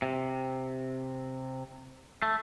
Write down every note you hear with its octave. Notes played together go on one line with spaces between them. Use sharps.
C3
A3